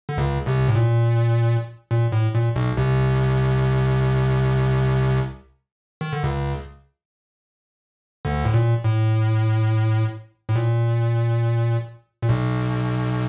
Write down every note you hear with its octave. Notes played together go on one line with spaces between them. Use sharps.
D3
C#2 C#3
C2 C3
A2
A#2
A#2
A2
A#2
B1 B2
C2 C3
D#3
D3
C#2 C#3
D2 D3
A2
A#2
A2
A2
A#2
A#2
B1 B2